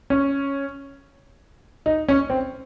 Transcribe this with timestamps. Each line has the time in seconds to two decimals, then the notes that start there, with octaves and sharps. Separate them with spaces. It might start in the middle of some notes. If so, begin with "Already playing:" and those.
0.10 C#4
1.86 D#4
2.09 C#4
2.30 C4